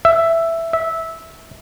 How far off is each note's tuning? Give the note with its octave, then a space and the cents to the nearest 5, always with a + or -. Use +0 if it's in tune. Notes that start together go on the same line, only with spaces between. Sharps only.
E5 +5
E5 -15